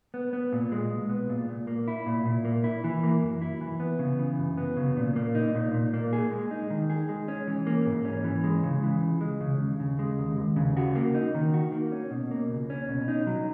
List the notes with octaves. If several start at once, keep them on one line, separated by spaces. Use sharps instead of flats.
B3
B3
A#2
G#3
B1
B3
A#2
A#2
A#3
E4
A#2
A#2
A#3
E4
E3
A#3
F#2
E4
E3
B3
C#3
E3
F#2
B3
C#3
A#2
A#3
D#4
A#2
A#2
A#3
G#4
G#3
D#4
D#3
G#4
G#3
C#4
E3
A#3
G#2
C#4
E3
G#3
C#3
E3
C#2
G#3
C#3
D#2
C#3
G#3
D#2
D#2
C#3
F#4
A#3
D#4
D#3
F#4
A#3
C#4
B2
A#3
C#2
C#4
B2
D#4
F#3